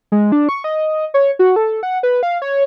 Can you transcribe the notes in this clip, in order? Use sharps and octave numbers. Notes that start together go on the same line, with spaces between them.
G#3
D4
C#6
D#5
C#5
F#4
A4
F#5
B4
F5
C#5